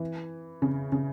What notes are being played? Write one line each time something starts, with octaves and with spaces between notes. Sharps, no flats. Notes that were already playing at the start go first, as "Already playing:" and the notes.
Already playing: E3
C#3
C#3